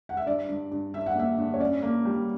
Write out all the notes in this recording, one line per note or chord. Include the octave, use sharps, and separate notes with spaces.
F#5
E5
G2 D5
G2
G2
G2 E5
F#5
A#3 E5
G2
C#5
C#4 D5
A#3
G3